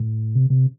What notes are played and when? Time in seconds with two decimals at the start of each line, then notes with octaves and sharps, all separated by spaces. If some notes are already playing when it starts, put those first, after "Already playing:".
Already playing: A2
0.35 C3
0.50 C3